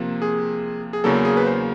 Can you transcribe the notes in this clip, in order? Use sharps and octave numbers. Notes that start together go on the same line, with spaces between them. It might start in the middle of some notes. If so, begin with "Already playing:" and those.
Already playing: C3 F3 A#3
G#4
G#4
E2 C#3 F#3 A#3 A4
G#4
B4
C5